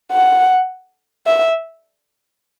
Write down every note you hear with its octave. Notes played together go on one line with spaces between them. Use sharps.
F#5
E5